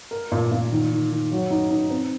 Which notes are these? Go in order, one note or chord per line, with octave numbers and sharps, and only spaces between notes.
A#4
A#2
A#2
D#3
D#3
D#3
F#3
D#4
D#4
C4